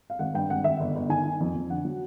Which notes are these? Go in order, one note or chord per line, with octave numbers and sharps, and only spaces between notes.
F5
G#1 F#5
G2 G5
G#1 F#5
G#1 E5
G1
G1
D#3 G#5
D#3
F2
F2
D3 F#5
F#3